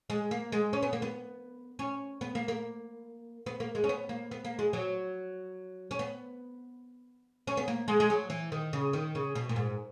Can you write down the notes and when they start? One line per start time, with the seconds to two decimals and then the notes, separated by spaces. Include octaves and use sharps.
0.10 G#3
0.31 A#3
0.52 G#3
0.73 C#4
0.83 B3
0.93 A#3
1.02 B3
1.79 C#4
2.21 B3
2.35 A#3
2.48 A#3
3.46 B3
3.60 A#3
3.75 G#3
3.84 C#4
3.89 B3
4.09 A#3
4.31 B3
4.45 A#3
4.59 G#3
4.73 F#3
5.91 C#4
5.99 B3
7.47 C#4
7.57 B3
7.68 A#3
7.88 G#3
8.00 G#3
8.10 F#3
8.30 E3
8.52 D#3
8.73 C#3
8.93 D#3
9.15 C#3
9.35 B2
9.49 A#2
9.56 G#2